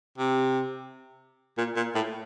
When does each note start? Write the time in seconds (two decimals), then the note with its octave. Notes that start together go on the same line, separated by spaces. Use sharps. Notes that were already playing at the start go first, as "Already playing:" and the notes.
0.18 C3
1.58 A#2
1.76 A#2
1.95 A2